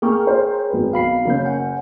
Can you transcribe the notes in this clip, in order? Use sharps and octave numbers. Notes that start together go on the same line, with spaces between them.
A#3 G#4 A#4 G5 C#6 F6
C5 C#5
G#1 B4
B1 F5 B5 C7
F#1 C#4 G6
F#5 G#5